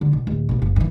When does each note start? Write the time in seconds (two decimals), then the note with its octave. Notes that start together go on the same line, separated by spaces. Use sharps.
0.01 D3
0.13 B1
0.27 D1
0.49 D#1 B1
0.62 F#1
0.76 G2 E3